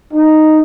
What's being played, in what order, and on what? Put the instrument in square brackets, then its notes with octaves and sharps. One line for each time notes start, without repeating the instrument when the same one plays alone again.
[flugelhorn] D#4